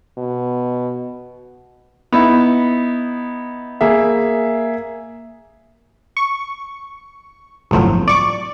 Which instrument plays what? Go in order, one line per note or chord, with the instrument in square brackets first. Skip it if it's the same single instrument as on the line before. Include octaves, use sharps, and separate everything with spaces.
[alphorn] B2
[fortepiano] B3 D#4 E4
[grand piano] A#3 G#4 E5
[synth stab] C#6
G1 C2 A2 F3 F#3
D5 C#6 D6